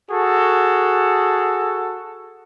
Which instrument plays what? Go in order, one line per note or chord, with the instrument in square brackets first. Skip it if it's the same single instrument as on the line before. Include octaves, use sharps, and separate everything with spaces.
[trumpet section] F#4 G#4 A4